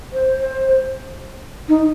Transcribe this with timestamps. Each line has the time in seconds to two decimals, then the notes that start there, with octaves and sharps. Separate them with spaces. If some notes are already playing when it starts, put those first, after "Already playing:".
0.13 C5
0.38 C5
1.68 D#4